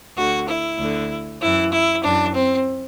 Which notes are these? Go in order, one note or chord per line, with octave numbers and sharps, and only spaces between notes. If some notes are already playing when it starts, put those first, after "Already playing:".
D2 D3 F#4
E4
D2 D3
F#2 E3 E4
E4
F#2 E3 D4
C4